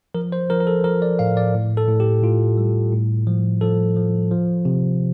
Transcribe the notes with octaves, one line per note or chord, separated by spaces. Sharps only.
F3 A#4
C5
F3 A#4
A#4
A4
F3 A#4
D5
A2 F5
D5
A2
A4
A2
G4
A2 F4
G3
A2
F3
F3 A4
F3
F3
C3